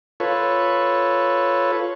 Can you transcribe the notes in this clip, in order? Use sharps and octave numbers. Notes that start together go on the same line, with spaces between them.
F4 A4 B4 C#5